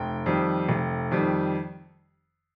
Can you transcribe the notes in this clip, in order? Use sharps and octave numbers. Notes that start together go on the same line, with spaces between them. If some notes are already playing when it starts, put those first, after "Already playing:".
Already playing: F1 G5
F2 D#3 G3
F1
F2 D#3 G3